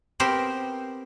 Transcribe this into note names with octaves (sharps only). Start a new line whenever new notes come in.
B3 C4 G4 A#4 C5